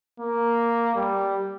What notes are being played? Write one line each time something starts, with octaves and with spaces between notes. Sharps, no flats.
A#3
G3